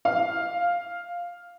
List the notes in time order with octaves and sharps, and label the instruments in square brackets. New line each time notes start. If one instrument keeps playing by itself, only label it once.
[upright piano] F5